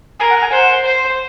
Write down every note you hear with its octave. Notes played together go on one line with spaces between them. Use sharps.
A#4 G#5
F#5
G#5
C5 F#5
C5